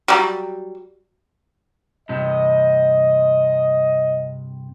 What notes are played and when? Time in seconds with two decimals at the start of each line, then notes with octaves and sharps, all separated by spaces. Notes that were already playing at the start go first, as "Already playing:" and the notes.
0.08 F#3 G3
2.09 G2 C3 D#5